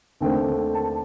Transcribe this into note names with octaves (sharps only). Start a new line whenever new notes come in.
D#2 D3 A3 C4 G5
A5